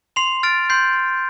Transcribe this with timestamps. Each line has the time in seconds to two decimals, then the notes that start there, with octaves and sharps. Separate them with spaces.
0.16 C6 C7 F7
0.43 F6 A6 D7
0.70 C6 G6 C7